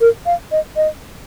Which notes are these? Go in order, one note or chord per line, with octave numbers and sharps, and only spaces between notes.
A#4
F5
D#5
D#5